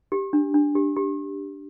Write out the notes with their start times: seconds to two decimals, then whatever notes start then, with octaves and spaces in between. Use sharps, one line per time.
0.12 G4
0.33 D4
0.54 D4
0.75 G4
0.96 G4